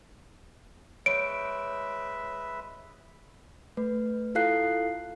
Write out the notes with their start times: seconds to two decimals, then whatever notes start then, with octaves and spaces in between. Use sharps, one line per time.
1.06 G#3 B4 C#5 E5 D7
3.77 A3 B4
4.35 E4 F4 A4 F5 F#6 C7